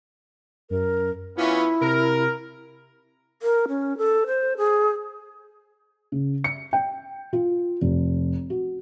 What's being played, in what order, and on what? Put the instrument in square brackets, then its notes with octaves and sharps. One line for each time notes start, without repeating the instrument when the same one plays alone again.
[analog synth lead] F#2 [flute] A#4
[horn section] E3 B3 C#4 [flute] E4 [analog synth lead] F4
[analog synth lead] C3 [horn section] A#4
[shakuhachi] A#4
C#4
A4
C5
G#4
[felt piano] C#3
C#7
G5
F4
F1
F#4